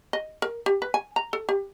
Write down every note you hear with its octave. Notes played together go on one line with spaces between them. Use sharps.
D#5
A#4
G4
B4
G#5
A#5
A4
G4